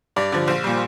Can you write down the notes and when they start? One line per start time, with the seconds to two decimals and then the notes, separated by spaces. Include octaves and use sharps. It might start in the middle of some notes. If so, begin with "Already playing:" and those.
0.16 G2 D5
0.32 D3 F3
0.48 A#1 C5
0.64 A#2 G3